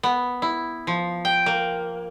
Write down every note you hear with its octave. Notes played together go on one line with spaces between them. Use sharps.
B3
E4
F3
G5
A#3